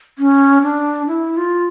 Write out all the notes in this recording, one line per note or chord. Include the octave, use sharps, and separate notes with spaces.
C#4
D4
E4
F4